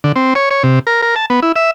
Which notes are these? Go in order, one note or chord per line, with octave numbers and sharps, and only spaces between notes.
D3
C4
C#5
C#5
C3
A#4
A#4
A5
B3
E4
E5